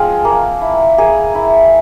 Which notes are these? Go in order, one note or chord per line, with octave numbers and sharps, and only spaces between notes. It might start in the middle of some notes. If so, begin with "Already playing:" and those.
Already playing: F3 G#3 C4 F4
A#3
E4
A#3 G#4
E4